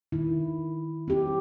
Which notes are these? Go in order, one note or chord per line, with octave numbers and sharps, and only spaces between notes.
D#3 E4
C4 G4